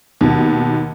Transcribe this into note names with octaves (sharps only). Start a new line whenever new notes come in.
D#2 B2